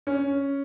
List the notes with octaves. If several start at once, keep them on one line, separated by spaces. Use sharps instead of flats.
C#4